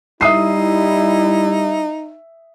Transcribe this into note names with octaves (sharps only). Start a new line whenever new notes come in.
G3 D#4 E4 E5 D#6 C7